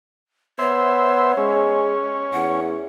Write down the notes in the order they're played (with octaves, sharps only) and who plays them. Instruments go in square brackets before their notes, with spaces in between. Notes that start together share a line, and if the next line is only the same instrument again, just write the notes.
[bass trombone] B3 [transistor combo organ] C5 E5 [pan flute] C#5
[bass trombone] G#3 [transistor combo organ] C#4
[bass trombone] E2 [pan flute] F#5